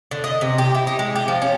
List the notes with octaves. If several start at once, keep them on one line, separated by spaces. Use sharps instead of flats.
D3
D#5
C3
G4
E4
D#4
G#3
G4
F3
C#4